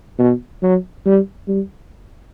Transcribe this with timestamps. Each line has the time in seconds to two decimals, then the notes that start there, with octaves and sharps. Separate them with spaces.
0.19 B2
0.62 F#3
1.06 G3
1.48 G3